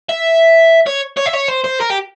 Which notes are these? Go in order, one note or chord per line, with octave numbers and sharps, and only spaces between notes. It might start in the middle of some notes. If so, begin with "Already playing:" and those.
E5
C#5
C#5
E5
C#5
C5
C5
A#4
G4